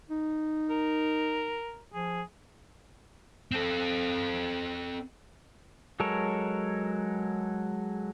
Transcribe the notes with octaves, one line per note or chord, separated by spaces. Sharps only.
D#4
A#4
F3 G#4
C4 A4
F#3 G#3 A4 A#4 C#5